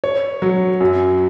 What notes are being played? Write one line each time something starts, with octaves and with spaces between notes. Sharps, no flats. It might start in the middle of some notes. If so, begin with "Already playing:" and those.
C#5
F#3
F#2